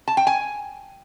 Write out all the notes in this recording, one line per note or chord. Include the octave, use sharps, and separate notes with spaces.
A5
G5
G#5